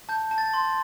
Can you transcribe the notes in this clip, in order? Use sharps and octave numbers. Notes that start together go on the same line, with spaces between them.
A5 G6
A5
A6
C6